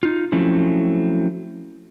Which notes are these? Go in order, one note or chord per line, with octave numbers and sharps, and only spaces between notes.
D#4 F4
F3 F#3 A3 C4 C#4 E4